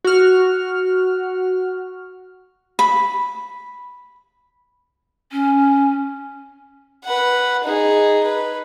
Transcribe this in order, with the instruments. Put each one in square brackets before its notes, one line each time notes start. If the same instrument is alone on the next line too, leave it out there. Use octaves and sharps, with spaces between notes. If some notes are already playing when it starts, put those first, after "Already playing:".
[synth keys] F#4 F6
[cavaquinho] B5
[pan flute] C#4
[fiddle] B4 F#5
D#4 G#4
B4